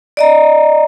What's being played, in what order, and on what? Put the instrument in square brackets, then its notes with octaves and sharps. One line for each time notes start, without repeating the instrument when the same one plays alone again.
[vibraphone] D5 D#5 A#5